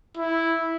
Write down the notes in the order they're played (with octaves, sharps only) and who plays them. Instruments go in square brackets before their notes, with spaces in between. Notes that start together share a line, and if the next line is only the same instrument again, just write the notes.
[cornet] E4